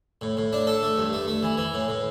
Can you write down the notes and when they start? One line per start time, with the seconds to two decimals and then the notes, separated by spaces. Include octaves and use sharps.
0.21 A2
0.37 A2
0.53 D4
0.67 A4
0.83 A3
0.98 G2
1.13 A3
1.28 A3
1.43 E3
1.58 E3
1.74 A2
1.88 A2